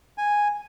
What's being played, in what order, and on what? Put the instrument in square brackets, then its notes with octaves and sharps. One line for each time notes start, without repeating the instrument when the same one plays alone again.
[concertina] G#5